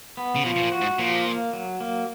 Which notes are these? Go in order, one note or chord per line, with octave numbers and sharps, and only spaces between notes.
B3
C#3
B2 F3
B2
A#2
F#4
G#2
A#2 F3
A#3
F#3
A#3